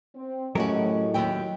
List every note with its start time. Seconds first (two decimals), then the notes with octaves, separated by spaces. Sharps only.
0.16 C4
0.55 A2 F#3 A3 C#4 F#4 G4 A#4 D#5
1.14 D#2 E4 G5